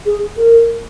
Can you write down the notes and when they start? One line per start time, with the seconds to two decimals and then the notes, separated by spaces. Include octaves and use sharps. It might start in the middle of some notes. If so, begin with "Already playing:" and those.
0.06 G#4
0.37 A#4